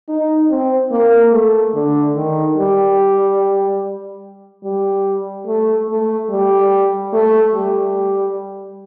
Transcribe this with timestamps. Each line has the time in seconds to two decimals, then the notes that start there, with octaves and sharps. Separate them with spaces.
0.09 D#4
0.50 C4
0.91 A#3
1.32 A3
1.74 D3
2.15 D#3
2.57 G3
4.64 G3
5.47 A3
5.89 A3
6.30 G3
7.13 A3
7.54 G3